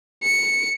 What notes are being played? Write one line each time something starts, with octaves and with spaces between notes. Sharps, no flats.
C#7